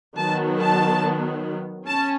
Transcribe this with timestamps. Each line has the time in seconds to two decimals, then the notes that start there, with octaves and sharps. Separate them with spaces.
0.17 D#3 F#3 B3 A5
0.60 A5
1.88 C#4 A5